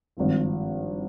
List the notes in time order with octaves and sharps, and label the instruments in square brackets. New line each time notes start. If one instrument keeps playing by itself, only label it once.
[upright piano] G#1 G2 F3 C4